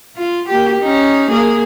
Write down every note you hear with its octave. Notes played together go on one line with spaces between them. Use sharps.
F4
A#3 G4
C#4 D#4
A#3 G#4